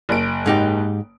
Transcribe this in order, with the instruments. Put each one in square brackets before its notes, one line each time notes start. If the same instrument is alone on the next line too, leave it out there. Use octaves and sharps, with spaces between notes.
[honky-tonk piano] F#1 D7
[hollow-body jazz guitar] G#2 D#4 G4